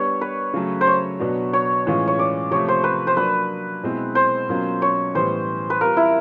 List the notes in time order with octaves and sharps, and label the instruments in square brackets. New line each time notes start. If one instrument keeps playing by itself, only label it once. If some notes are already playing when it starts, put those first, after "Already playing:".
Already playing: [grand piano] G3 B3 D4 [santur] C#5
[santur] B4
[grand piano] C#3 F#3 A3
[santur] C5
C#5
[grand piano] B2 F#3 B3 D4 F#4
[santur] C#5
[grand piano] A2 E3 G#3 C#4 F4
[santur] C#5
D5
[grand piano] C3 F3 A3 [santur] C#5
[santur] C5
B4
C5
[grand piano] F#3 A#3 D4 [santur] B4
[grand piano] B2 G#3 C4 E4
[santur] C5
[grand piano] B2 F#3 A#3 C#4 F4
[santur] C#5
[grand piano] A2 E3 G3 B3 [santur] C5
[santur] B4
[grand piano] G3 C4 F4 [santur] A#4
[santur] E4